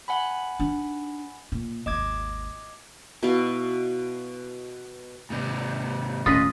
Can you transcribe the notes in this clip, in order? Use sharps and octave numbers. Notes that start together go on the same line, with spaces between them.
F#5 G#5 B5
D4 D#4
A#2
G#1 D#2 D#5 D6 G#6
B2 E4 D#5 F5
G#2 C3
D#1 A2 C#4 F4 B4 D#5 D#6